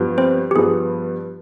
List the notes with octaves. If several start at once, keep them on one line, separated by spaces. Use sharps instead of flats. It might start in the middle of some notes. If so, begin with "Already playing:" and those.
Already playing: G2 F3 B3
C4 C5
G4
G2 F3 B3 G#4